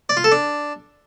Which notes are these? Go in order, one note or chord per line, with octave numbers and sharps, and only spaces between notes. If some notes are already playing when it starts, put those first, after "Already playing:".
D5
F4
A4
D4